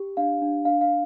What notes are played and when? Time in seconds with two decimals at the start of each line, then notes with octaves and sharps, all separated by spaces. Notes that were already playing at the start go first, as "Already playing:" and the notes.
Already playing: G4
0.17 D4 F5
0.42 D4
0.65 D4 F5
0.81 F5